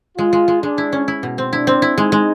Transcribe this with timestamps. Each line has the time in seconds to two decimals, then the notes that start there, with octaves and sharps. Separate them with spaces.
0.18 G#3 F4
0.33 G#3
0.48 G#3
0.62 G#3 D4
0.78 E4
0.93 C#4
1.08 E4
1.23 B2
1.38 C4
1.53 D4 E4
1.67 C4
1.82 E4
1.98 G#3 D#4
2.12 G#3